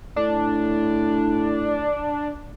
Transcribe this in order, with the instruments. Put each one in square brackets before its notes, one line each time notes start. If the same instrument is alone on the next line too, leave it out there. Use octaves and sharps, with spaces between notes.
[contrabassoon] A2 [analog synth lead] D4